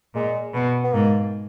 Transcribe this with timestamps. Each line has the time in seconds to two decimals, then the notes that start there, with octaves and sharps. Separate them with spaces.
0.15 A#2 G#3
0.54 B2
0.84 B3
0.93 G#2 A#3